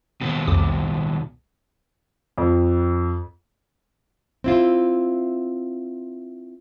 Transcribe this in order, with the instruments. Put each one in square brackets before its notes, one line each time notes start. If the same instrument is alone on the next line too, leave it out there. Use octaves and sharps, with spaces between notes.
[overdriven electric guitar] D#2 B2
[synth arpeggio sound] C2 F2 D6
[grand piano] F2
[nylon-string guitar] C4 E4 F4